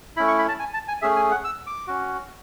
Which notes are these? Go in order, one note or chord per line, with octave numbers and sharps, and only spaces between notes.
A3 C#4 E4 B5
C#6
B5
A5
G#5
A5
G#5
A3 C#4 G#4 E5
G#5
F#5
E6
D6
C#4 F#4